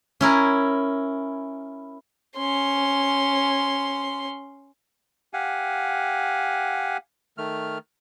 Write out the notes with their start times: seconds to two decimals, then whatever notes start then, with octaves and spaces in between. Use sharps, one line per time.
0.21 C#4 E4 A#4
2.37 C#4 C6
5.33 G4 F5 F#5 G#5
7.38 D#3 A3 F6